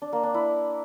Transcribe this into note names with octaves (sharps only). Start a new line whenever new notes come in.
D4
A#3
D4
E4